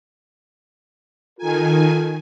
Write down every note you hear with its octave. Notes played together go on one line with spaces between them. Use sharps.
D#3 F4 A4 A#4 G#5